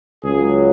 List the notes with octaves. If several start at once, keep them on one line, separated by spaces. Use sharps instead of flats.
C#2 C#3 F#3 G#4